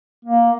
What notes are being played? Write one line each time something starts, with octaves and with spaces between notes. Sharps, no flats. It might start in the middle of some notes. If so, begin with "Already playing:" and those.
A#3